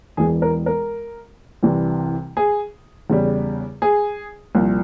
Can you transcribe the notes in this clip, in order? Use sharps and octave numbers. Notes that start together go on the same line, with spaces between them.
E1 E2 E3 G#4
A#4
A#4
C2 C3 E3 G3
G#4
E2 C#3 G3
G#4
C2 A#2 F3